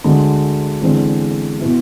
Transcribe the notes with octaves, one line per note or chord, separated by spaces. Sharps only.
D2 D3 G#3
E2 D3 G#3 C4
B2 B3 E4